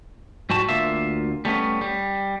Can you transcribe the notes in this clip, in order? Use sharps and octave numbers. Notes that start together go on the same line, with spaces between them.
G#2 G3 F#4 A5
D2 A#3 F4 E5
G3 A3 B3 C#4
G3